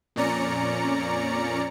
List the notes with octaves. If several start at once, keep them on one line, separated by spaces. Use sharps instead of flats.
F2 A#2 C#4 D5 A#5 C#7